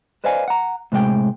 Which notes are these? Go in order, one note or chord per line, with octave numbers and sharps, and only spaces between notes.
B4 C5 D5 D#5 F5 G#5
F#5 A#5
A2 C3 G#3 D5 G5